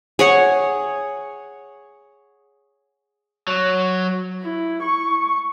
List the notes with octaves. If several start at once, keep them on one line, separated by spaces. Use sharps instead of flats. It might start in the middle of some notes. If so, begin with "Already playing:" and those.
G#4 C#5 F#5
F#3
E4
C#6